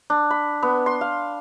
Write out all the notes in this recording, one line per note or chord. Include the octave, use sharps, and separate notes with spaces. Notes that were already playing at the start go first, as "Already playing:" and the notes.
D4
B5
B3
C6
F5